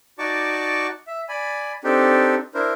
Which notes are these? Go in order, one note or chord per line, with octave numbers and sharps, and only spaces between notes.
D#4 F#4 D5 A5 C#6 D6
E5
D5 G#5 B5
C4 D4 D#4 G4 A4
D4 E4 A#4 C5